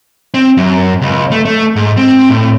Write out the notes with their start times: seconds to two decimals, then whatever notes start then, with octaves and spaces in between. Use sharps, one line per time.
0.34 C4
0.57 F#2
1.02 C#2
1.32 A3
1.45 A3
1.76 G#2
1.97 C4
2.30 A2